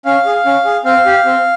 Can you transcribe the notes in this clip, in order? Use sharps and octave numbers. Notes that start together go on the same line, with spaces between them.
C#4 F5
G#4
C#4
G#4
C4 F5
G4
C4